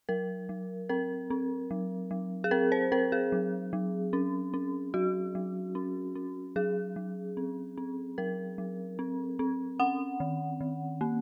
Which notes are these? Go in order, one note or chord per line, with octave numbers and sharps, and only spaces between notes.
F#3 A#4
F#3
C4 A#4
C4
F#3
F#3
G#4
C4 A#4
C5
C4 A#4
G#4
F#3
F#3
C#4
C#4
F#3 F#4
F#3
C#4
C#4
F#3 G#4
F#3
C4
C4
F#3 A#4
F#3
C4
C4
C#4 F#5
D#3
D#3
A#3